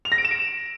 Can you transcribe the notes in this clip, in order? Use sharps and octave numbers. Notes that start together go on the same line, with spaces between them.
F7
A#6
D7
E7
D7